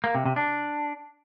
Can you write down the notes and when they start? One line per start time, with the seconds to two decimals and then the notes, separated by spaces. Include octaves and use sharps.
0.04 A#3
0.15 C3
0.25 C3
0.36 D4